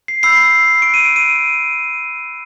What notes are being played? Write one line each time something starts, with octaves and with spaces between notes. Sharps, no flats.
C7
B5 E6 G6 C7
C#6 D7
F#6
D#7
D7
D#7